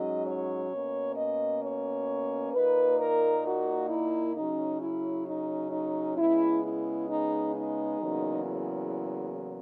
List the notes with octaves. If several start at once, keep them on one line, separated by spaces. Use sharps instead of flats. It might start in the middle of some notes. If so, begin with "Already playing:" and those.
Already playing: G#2 F#3 C#4 D#5
C#5
B2 A#3 C#4
D#5
C#5
A#2 A#3 D#4 B4
A#4
F#4
E4
C#3 F#3 C#4 D#4
E4
D#4
D#4
C#3 G#3 B3 E4
E4
D#4
D#4
E2 C#3 F#3 A#3
E4